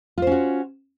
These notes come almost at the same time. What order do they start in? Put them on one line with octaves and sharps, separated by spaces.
F4 C5 C#4 F#4